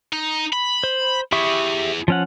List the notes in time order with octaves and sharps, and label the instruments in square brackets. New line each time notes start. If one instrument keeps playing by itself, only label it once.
[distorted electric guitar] D#4
B5
[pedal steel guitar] C5
[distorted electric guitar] E4 G#4 [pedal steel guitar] G4 E5 C#6
[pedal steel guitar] F3 C#4 F#5